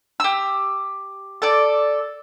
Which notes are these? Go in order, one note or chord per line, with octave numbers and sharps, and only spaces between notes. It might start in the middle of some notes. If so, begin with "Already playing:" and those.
G4 E6
A4 D5